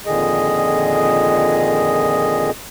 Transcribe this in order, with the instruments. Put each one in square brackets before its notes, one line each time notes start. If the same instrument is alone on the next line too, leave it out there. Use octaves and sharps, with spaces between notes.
[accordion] F2 A#2 D3 D#3 G#4 D#5